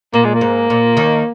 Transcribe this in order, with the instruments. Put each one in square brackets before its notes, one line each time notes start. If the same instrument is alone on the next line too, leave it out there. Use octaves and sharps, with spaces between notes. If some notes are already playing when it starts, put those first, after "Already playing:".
[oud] A#2 [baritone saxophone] A#3
[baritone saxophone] G#3
A#3
[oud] G#2
A#2
D#2 D#3